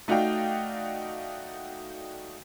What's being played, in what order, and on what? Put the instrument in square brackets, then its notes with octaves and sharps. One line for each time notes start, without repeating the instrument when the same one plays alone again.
[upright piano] A3 D#4 F#4 D5 F5 G5